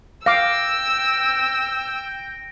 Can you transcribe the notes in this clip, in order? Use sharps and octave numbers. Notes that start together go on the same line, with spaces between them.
F5 G5 D6 E6 A#6 D7